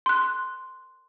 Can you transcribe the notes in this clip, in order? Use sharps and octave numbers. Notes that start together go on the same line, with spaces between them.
C6 F#6